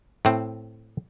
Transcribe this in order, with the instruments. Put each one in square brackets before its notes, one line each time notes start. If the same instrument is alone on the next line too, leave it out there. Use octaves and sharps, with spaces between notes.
[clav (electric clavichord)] A2 C4